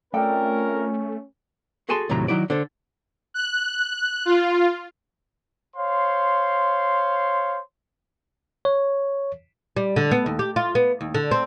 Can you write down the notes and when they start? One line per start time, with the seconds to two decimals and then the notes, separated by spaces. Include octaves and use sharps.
0.14 A3 C4 C#4 F4 A4 A#4 D5 G5
1.89 F#4 G#4 A4 G#5 A5 C6
2.09 D#2 A2 C3 F#3 A#5
2.28 D#3 F#3 D#4 E4 D5
2.50 D3 A4 C5
3.34 F#6
4.25 F4
5.76 C5 C#5 F5 C6
8.65 C#5
9.76 G3
9.96 D3
10.11 B3
10.26 D#2
10.39 G4
10.56 F4
10.75 B3
11.01 D#2
11.15 D3
11.31 C4